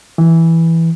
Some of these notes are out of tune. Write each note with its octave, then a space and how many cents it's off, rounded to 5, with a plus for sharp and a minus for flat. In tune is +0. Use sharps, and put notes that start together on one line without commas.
E3 -5